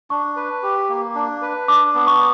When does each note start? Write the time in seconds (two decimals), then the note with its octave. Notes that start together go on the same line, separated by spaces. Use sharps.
0.10 D4 C#6
0.36 B4
0.63 G4
0.89 A#3
1.15 D4
1.42 B4
1.68 D4 D6
1.95 B3
2.07 C#6